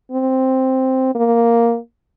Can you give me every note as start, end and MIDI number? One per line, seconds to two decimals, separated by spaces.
0.12 1.15 60
1.15 1.78 58